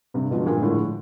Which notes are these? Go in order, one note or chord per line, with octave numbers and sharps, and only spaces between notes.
G2 C3
B2 D3 F3 G#3
G2 A#2
A2 D3 F3 G#3